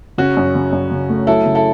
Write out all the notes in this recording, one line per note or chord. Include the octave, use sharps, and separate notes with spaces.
C#3 C#4 F#4
F#2
C#3
F#2
C#3
A3
F#3 E4 A4
C#3
E4 A4